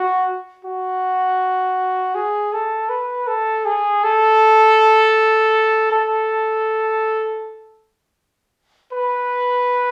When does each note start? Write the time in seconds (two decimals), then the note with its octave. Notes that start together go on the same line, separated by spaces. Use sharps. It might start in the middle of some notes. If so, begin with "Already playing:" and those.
Already playing: F#4
0.64 F#4
2.15 G#4
2.53 A4
2.90 B4
3.27 A4
3.65 G#4
4.04 A4
5.91 A4
8.93 B4